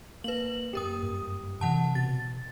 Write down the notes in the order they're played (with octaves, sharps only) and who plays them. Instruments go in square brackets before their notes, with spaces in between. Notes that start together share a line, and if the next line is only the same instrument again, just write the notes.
[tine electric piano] A#3 [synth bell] B4 F#7
[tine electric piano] F#2 G4 [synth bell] A#3 A#4 D#6
[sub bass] G2
[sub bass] C3 [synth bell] E3 F#5 A5
[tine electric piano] B2 [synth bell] A6